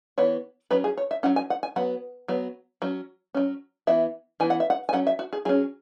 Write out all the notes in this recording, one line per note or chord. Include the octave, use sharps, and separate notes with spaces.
E3 B3 C#5
F#3 C#4 B4
G#4
C#5
E5
F#3 C#4 F#5
G#5
F#5
G#5
F#3 B3 F#5
F#3 B3
F#3 C#4
F#3 C#4
E3 B3 E5
E3 B3 G#5
F#5
E5
F#5
G#5
F#3 C#4 F#5
E5
F#4
G#4
F#3 C#4 G#4